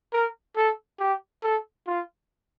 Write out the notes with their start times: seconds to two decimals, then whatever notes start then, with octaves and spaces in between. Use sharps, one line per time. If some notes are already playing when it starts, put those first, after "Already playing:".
0.12 A#4
0.56 A4
0.99 G4
1.43 A4
1.87 F4